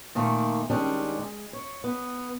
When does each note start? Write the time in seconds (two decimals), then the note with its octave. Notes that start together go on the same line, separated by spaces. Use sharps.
0.15 A#2 D#3 A3 A#3
0.70 D#3 G3 G#3 C#4 D4
1.19 G#3
1.53 C#5
1.84 B3